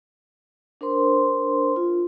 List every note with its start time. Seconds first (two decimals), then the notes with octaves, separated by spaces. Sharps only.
0.81 D4 A#4 C5 C6
1.76 F4